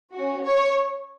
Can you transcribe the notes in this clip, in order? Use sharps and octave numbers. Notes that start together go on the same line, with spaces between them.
F#4
C#4
C#5